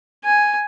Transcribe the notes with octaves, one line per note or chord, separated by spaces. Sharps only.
G#5